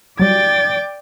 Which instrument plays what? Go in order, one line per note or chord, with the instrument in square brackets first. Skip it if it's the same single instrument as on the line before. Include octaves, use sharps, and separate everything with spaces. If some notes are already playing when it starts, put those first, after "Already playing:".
[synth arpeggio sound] F#3 G3 [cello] D5 G5 [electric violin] A6